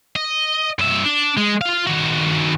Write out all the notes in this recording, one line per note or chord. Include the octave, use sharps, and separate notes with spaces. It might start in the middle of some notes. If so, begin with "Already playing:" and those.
D#5
G2 E5
D4
G#3
F4 F5
D#3 F#4